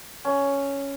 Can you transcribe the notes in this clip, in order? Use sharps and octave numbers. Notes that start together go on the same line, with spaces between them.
C#4